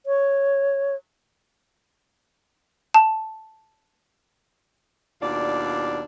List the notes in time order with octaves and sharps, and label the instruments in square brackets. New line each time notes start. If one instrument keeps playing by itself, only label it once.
[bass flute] C#5
[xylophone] A5
[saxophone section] D#2 B2 D4 F4 D5